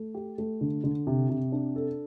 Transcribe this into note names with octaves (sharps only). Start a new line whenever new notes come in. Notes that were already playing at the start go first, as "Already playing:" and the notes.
Already playing: A3
G4
A3
D3
D3
C3
C3
D4
A4